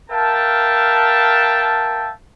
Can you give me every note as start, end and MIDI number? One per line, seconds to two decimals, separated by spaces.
0.10 2.10 70
0.10 2.10 76
0.10 2.10 77
0.10 2.10 79
0.10 2.10 81